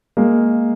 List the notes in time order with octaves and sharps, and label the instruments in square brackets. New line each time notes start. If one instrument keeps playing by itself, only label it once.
[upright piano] G#3 A#3